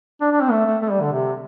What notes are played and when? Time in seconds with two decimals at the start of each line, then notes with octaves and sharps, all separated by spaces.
0.21 D4
0.32 D4
0.41 C4
0.51 A3
0.66 A3
0.82 A3
0.91 G3
1.02 D3
1.12 C3